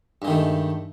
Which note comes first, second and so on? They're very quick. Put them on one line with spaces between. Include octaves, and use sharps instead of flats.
G2 G#3 D#3 A3